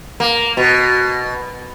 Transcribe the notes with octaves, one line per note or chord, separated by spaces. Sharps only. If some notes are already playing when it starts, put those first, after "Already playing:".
A#3
B2